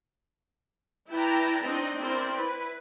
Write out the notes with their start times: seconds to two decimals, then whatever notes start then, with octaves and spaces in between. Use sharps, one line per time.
1.10 E4 B4 D5 G5 A5 A#5
1.63 C4 D4 D#4 D#5
1.98 C4 E4 A#4 C5 D5
2.33 E4 B4